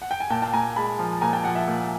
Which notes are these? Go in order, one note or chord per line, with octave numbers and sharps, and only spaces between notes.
F#5
G5
G#5
A#2 G5 A5
G5 A5
A#2 G#5 A#5
G#3 A5 B5
F3
A#2 G#5 A#5
G5 A5
F3 F#5 G#5
E5 F#5
A#2